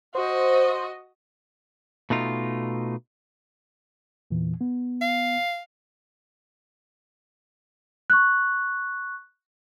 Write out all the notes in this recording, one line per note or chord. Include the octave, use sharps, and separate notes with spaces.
F#4 C5 D#5
B2 A3 D#4 F4
E2 A#2 E3
B3
F5
C#6 F#6